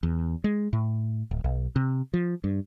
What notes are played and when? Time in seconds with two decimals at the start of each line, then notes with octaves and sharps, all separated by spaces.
0.03 E2
0.44 G#3
0.73 A2
1.31 D1
1.44 B1
1.76 C3
2.14 F3
2.44 G2